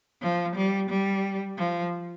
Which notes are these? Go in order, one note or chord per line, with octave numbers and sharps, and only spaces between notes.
F3
G3
G3
F3